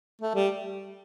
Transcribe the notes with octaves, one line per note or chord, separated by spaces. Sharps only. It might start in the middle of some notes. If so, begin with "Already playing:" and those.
A3
G3